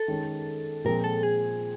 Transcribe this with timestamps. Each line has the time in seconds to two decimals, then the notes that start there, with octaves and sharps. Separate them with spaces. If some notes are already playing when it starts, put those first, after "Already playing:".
Already playing: A4
0.08 D#3 G#3 C#4
0.85 A#2 F3 G#3 C4 F4 A#4
1.04 A4
1.23 G#4